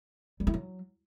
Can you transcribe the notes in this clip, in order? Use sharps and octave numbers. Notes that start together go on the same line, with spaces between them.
G3
E4
F#3